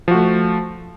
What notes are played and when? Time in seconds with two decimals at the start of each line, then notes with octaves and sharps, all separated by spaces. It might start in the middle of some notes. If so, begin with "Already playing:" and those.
0.08 F3
0.11 F#4
0.15 A3